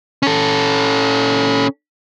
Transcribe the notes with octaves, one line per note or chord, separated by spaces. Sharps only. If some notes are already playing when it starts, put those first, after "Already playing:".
C#4 A4